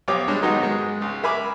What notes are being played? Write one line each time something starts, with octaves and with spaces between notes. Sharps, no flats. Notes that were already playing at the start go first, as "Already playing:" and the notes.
B1 F3 G4 C#5 F5 D6
G3 G#3 D4
D#3 F#3 G#3 B3 D#4 F#4
G#2 G#3
C#2
A#4 E5 G#5 B5 D6